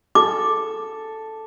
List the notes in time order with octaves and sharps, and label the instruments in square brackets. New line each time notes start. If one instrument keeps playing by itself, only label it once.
[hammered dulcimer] A4 [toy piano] D6